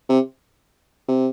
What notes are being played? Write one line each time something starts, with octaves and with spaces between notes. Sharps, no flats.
C3
C3